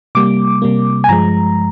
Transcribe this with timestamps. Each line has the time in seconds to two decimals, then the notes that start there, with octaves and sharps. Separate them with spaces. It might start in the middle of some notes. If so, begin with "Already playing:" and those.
0.15 C3 G3 A#3 D6
0.62 C3 G3 A#3
1.04 G#5
1.09 G2 F3 G#3 A#5